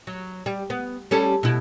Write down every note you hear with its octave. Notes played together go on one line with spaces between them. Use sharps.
F#3
G3
B3
G3 C#4 A4
B2 E4